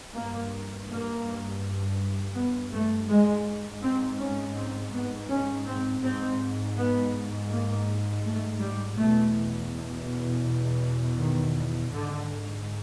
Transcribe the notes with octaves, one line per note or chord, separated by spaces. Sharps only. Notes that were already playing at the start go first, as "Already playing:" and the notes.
G2 A#3
A#3
B3
A3
G#2 G#3
C4
C#4
C4
B3
C#4
C4
G#2 C4
B3
A#3
A3
G3
E2 B2 A3
D#3
G#2 D3